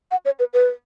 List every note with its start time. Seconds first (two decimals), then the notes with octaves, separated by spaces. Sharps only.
0.11 F#5
0.25 C#5
0.39 B4
0.54 B4